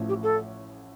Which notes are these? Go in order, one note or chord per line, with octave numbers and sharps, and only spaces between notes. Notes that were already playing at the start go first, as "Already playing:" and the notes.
Already playing: A1 A2 F3 A3
G4
A4